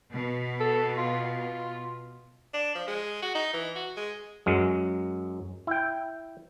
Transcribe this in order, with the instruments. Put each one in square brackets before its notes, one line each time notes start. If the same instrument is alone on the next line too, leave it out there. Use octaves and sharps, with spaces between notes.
[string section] B2
[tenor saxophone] A4
F4
D4
F3
G#3
F#4
D#4
E3
F#4
G#3
[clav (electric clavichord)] F#2 F#3 G#3
E4 G5